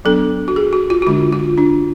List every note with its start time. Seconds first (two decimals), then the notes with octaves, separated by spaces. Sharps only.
0.05 F#3 B3 D4 A4
0.48 F#4
0.56 G#4
0.73 F#4
0.90 F4
1.02 F#4
1.07 D3 G#3 D4 F4
1.32 F4
1.57 D4